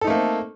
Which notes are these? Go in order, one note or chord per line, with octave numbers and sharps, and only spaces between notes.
A3 A#3 C4 D#4 A4